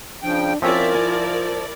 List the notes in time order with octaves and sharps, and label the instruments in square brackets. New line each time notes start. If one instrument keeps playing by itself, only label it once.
[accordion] C#3 F3 G5 [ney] D4
[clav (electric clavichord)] F3 C4 C#4 [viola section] E4 A#4 D5 [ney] F4 [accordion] E5
[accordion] F3 [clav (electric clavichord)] G#5